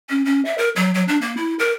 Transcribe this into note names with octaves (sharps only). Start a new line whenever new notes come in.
C#4
C#4
E5
A#4
F#3
F#3
D4
A#3
E4
A#4